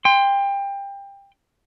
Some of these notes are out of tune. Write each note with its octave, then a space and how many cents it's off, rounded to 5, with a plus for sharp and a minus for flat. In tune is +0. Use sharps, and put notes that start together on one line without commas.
G5 +25 C6 -5